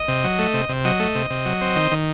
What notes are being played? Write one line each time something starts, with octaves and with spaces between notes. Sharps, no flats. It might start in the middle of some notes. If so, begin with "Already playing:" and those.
Already playing: D#5
C3
F#3
A3
C3
C3
F#3 D#5
A3
C3
C3
F#3
C4
D#3
D#3